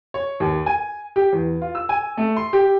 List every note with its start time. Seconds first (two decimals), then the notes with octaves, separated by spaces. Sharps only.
0.14 C#5
0.40 D#2
0.66 G#5
1.16 G4
1.33 E2
1.62 F4
1.75 E6
1.89 G#5
2.17 A3
2.36 C6
2.53 G4